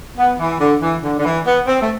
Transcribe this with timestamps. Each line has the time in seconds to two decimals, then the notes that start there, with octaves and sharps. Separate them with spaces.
0.18 B3
0.39 E3
0.59 D3
0.81 E3
1.03 D3
1.19 D3
1.24 E3
1.45 B3
1.66 C4
1.81 A3